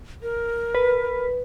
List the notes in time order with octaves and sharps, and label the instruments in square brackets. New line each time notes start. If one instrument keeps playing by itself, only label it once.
[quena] A#4
[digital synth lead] B4